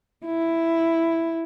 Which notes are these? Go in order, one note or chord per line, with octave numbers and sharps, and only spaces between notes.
E4